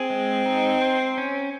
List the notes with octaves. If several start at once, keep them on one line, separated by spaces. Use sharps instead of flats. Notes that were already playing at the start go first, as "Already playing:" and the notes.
Already playing: C4 G#4
G#3
D#4
C5
C#4